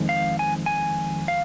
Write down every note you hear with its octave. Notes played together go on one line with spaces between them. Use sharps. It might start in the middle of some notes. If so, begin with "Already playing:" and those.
Already playing: F2 D#3 G#3
F5
G#5
G#5
F5